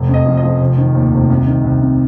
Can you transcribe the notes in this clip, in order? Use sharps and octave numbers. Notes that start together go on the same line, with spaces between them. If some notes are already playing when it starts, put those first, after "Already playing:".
Already playing: F1
F2
D#5
F3
D#5
F3
F1
D#3
D#2
F1
C2
D#3
C2
C3